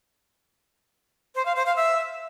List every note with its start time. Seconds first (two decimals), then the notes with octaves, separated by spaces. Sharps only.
1.35 C5
1.45 F5
1.56 C5
1.66 F5
1.76 E5